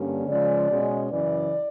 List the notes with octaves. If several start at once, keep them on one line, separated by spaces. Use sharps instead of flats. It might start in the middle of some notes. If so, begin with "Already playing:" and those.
Already playing: G2 D3 A#3 C#4
C#3 F3 G#3 D5
B2 G#3 C#4
F#2 C#3 E3 D5